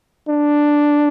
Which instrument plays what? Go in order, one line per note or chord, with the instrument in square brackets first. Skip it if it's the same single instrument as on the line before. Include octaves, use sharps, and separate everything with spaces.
[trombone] D4